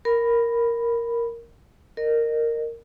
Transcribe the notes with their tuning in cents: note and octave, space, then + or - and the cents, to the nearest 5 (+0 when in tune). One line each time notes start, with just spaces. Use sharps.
A#4 +0 B5 +0
A#4 -10 D#5 -30